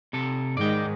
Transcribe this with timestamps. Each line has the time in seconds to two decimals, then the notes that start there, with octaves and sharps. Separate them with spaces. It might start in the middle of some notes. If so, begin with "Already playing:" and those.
0.13 C3 A4
0.57 G#2 D#3 G#3 D5 G5